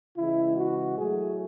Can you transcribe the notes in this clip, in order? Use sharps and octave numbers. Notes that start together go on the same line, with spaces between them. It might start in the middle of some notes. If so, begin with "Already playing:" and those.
C#3 E3 G#3 E4
F#4
A2 F#3 A3 G#4